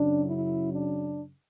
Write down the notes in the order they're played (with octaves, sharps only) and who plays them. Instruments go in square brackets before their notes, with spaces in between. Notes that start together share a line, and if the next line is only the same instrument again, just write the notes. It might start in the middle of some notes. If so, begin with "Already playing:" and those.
Already playing: [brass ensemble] F#2 C#3 F#3 D4
E4
D4